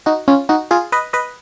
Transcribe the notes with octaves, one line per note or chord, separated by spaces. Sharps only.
D#4 F#4
C#4 F4
D#4 F#4
F4 G#4
B4 D#5
B4 D#5